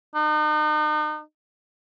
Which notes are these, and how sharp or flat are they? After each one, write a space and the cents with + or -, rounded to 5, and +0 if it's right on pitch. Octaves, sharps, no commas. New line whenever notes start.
D#4 -40